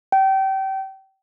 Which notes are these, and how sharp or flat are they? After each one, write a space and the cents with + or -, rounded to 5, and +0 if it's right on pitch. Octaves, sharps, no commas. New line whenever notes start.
G5 -30